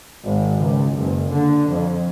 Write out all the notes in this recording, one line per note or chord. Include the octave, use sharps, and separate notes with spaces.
G#1
C#2
F#1
D3
F2